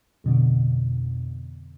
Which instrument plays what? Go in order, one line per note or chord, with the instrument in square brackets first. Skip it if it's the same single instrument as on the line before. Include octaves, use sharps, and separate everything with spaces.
[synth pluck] F2 B2 D3